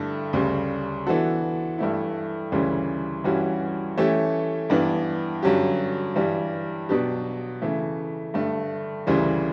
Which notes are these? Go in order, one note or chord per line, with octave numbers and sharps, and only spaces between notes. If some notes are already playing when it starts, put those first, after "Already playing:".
Already playing: G2 D3 A3 E4 A4
D2 C#3 G3
E3 B3 D4 F#4 A4
G2 E3 A3 E4
D2 C#3 E3 G3 C#4
G2 E3 G3 C#4 F#4
E3 A3 C#4 G4
G2 E3 B3 D4
G2 D3 F#3 C#4 G4
G2 E3 G3
B2 F#3 B3 D4 G4
C#3 E3 A3
G2 D3 A3
D2 C#3 E3 G3